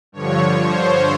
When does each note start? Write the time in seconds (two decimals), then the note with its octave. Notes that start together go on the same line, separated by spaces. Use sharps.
0.12 G2 D3 F3 C#5
0.62 C5